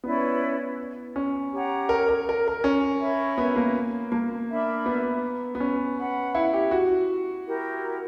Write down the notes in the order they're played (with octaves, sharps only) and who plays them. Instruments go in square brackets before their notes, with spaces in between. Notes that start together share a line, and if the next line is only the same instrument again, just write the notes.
[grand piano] B3 [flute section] C#4 E4 B4 D5
[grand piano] C#4
[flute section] G4 C#5 F#5 A#5
[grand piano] A#4
A#4
A#4
A#4
C#4
[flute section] A#4 C#5 E5 B5
[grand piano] B3
A#3
A#3
[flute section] D4 A#4 E5 B5
[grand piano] B3
B3
C#4
[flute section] B4 F#5 B5
[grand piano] E4
G4
F#4
[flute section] E4 G4 A#4